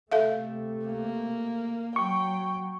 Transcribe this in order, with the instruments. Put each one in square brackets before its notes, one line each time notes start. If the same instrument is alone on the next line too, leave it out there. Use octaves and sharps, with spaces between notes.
[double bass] C3 A3 [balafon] A4 E5 F5
[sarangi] A#3
[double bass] F#3 [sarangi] G5 [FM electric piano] C#6